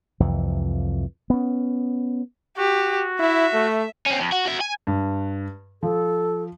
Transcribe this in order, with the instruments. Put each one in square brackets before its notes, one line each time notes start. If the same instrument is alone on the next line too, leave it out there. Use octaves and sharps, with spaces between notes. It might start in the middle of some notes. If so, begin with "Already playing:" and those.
[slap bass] C2 F2 E3
B3 C#4
[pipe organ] F#4 [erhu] G4
[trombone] E4 [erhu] E5
[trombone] A3
[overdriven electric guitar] C4 C#4
F2
F#4
F#4 E5
G#5
[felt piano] G2
[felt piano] F3 [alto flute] A4